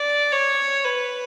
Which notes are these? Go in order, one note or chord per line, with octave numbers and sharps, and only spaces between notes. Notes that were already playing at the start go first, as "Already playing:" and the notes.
Already playing: D5
C#5
B4